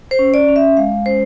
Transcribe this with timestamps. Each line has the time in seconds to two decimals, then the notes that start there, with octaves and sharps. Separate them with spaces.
0.11 C5
0.19 C#4
0.34 D5
0.48 C#4
0.56 E5
0.77 G#3 F5
1.06 C#4 C5